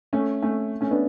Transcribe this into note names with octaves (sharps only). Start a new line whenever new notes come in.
A3 C#4
A3 C#4
A3 C#4
B3 D4